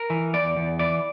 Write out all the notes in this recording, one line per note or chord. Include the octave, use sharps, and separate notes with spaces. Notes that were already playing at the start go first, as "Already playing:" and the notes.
Already playing: A#4
E3
E2 D5
E2
E3 D5